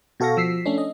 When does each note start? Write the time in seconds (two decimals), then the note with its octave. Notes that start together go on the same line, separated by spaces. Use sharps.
0.20 B2 F#4 A4 F5 C#6 A#6
0.37 F3 E6 B6 C7
0.66 A3 C#4 D4
0.78 D#5